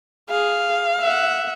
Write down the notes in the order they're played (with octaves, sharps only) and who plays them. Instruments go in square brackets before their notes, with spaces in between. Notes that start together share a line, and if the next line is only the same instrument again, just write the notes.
[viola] G#4 [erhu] F5
[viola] E5 F#5